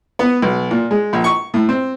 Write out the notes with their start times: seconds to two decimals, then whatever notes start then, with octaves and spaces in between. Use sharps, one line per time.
0.19 B3
0.42 B1
0.71 A#2
0.91 G#3
1.13 A#1
1.24 C#6
1.54 A2
1.69 C4